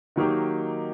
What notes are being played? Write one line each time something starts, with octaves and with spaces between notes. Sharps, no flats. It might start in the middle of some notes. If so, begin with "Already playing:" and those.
D#3 F#3 A#3 D#4 G4